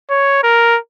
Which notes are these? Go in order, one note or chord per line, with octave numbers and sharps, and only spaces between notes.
C#5
A#4